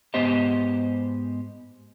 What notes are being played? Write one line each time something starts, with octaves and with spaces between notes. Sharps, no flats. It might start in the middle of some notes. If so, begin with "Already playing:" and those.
G#2 B3 G4 C5 D#5